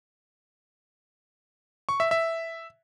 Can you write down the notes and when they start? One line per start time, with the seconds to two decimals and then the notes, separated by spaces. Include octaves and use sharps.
1.89 C#6
2.00 E5
2.11 E5